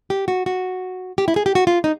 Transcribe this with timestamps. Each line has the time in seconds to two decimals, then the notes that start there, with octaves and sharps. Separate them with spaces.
0.10 G4
0.28 F#4
0.46 F#4
1.18 G4
1.28 E4
1.36 G#4
1.46 G4
1.55 F#4
1.67 F4
1.84 D#4